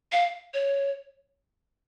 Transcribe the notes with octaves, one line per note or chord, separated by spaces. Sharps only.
F5
C#5